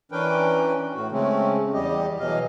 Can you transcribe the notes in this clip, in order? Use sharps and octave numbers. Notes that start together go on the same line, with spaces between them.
E3 C#4 D4 A#4 B4 G5
A2 F#4
C#3 G#3 A3 C4 C#4
E2 G3 G4 D#5
B2 E3 F#3 D#5 F5